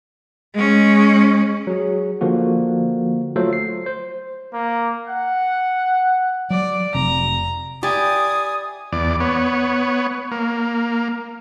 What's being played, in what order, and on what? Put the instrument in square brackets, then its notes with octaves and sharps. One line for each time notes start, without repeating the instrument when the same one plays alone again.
[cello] G#3 C#4
[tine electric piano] F#3 G#4
D3 F3 A#3 F#4
F#3 A3 F4 A4 C5
C7
C5
[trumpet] A#3
F#5
[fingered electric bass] F#3 [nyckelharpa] D5
[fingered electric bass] F1 C3 [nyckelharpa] A#5
[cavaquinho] E4 D5 [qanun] G4 [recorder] G#5 [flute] D#6
[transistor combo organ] E2 D5
B3 C#5
A#3